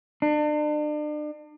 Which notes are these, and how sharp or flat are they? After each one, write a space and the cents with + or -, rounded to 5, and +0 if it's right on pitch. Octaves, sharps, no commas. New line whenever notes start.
D4 +40